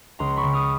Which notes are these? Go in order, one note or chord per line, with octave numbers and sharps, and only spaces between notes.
C#2 A#5 C6
B5 C#6
C#3
D#6 F6